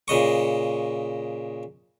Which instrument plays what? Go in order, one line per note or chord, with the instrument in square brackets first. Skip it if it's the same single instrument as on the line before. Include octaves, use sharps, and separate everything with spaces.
[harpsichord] A#2 C#3 D#5 C#6